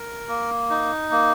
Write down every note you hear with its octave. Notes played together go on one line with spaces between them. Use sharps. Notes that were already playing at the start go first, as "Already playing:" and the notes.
Already playing: A#4
A#3
D#4
A#3